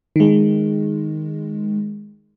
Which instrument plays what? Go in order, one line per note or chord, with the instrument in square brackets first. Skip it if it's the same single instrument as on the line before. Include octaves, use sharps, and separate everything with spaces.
[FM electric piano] D#3 G#3